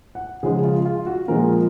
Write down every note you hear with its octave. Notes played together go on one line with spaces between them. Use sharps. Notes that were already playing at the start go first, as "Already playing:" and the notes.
F#5
C#3 F3 G#3 G#4
F4
F4
F#4
A#2 F3 G#3 A#4